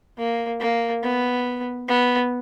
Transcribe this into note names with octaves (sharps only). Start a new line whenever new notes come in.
A#3
A#3
B3
B3